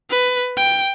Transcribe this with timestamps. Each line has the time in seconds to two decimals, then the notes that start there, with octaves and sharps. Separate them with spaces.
0.10 B4
0.57 G5